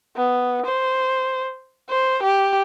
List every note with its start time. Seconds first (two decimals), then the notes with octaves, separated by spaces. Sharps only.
0.17 B3
0.66 C5
1.89 C5
2.23 G4